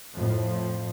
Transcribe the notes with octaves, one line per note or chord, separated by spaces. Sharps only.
F2 A2 F3